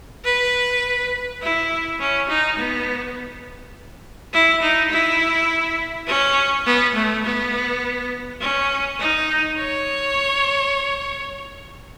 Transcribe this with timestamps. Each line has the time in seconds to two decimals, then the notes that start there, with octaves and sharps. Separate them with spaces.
0.25 B4
1.42 E4
2.00 C#4
2.29 D#4
2.58 B3
4.33 E4
4.62 D#4
4.92 E4
6.07 C#4
6.66 B3
6.95 A3
7.24 B3
8.41 C#4
9.00 D#4
9.58 C#5